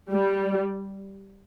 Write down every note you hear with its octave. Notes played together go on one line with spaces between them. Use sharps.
G3